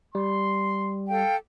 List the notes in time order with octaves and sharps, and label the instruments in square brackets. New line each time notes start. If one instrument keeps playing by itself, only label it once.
[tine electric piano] G3 [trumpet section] C6
[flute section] A4 F5 G5